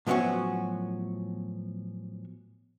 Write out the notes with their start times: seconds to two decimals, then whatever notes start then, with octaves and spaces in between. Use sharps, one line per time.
0.07 A2 F3 F#3 B3 C#4 F#4